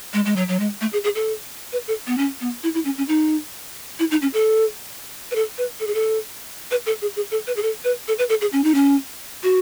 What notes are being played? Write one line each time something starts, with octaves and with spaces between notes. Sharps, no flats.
G#3
G#3
F#3
F#3
G#3
A3
G#4
G#4
A4
B4
A4
B3
C#4
B3
E4
E4
C#4
C#4
D#4
E4
D#4
C#4
A4
B4
A4
B4
A4
G#4
A4
B4
A4
G#4
G#4
A4
B4
G#4
A4
B4
A4
B4
A4
G#4
C#4
D#4
C#4
F#4